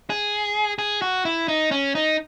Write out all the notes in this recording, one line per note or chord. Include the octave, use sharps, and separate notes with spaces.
G#4
G#4
F#4
E4
D#4
C#4
D#4